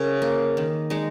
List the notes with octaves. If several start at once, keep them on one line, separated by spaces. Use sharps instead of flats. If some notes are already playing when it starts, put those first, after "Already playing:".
Already playing: C#3 A#4 C#5
A#3
D#3
G#3 D#4